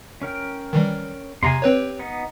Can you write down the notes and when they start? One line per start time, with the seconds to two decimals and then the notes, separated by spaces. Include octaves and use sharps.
0.22 C#4 A#4 G5
0.73 D#3 E3 G3
1.43 E2 C3 G#5 A#5 C6
1.62 C4 G4 B4 C#5
1.99 B3 D#4